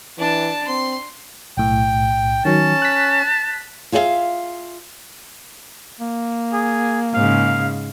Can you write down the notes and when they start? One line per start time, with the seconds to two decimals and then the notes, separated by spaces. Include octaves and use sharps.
0.18 E3 D4 A5
0.67 C4 C6
1.57 B1 A2 G5
2.45 D#3 F#3 C#4 A5
2.82 F#6 B6
3.92 F4 G#4 C5 D5 E5 F5
6.00 A#3
6.53 G#4
7.14 G#2 C#3 F5